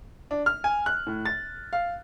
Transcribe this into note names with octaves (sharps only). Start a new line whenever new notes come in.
D4
F6
G#5
F#6
A2
A6
F5